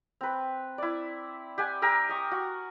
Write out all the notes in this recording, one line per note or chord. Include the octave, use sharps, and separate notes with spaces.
C4 B4
E4 D5
G4 F#5 G#5
G4 A#4 G#5 E6
C#6 D#6
F#4